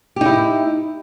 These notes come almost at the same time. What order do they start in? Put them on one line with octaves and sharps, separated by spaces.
G4 D#4 E4